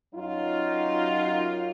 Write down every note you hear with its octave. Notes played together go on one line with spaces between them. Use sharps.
F#2 F#3 D#4 F4